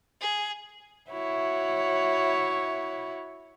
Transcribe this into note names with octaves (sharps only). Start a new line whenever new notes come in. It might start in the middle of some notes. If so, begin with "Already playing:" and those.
G#4
E4 F#4 C#5